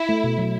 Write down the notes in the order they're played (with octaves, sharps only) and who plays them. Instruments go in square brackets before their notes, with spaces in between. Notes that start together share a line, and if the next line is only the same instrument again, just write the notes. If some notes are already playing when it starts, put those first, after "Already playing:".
Already playing: [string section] E4
[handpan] A3
B2
F#3